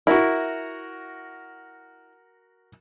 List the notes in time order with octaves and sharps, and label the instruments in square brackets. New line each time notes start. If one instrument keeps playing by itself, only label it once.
[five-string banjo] E4 [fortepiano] F#4 A#4